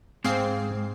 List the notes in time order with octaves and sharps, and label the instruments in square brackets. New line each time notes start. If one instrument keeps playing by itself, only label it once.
[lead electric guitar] G#2 [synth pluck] C4 C7 [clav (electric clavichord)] G#4 F5